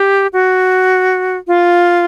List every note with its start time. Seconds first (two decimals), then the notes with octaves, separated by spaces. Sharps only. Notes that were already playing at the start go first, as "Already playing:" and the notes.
Already playing: G4
0.33 F#4
1.47 F4